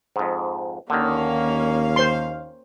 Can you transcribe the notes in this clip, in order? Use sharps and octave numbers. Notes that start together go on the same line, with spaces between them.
F2 G#2
D#2 D3 D#3 A#3 C#4 F5
C5 C6